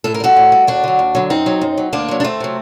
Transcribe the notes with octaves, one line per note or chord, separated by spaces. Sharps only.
A2 A4
A#4
G3 F#4 A4
A2
G3
D#2 D4 F#4
D3 F#3
D#2
D3 F#3
F#2 C4 D#4
F#3
F#2
F#3
D2 A#3 D4
C3 F#3
D4
D2 A3 C4
C3 F#3